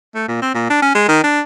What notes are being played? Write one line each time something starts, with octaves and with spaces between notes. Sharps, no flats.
A3
A#2
C4
A#2
D4
C#4
G#3
D#3
D4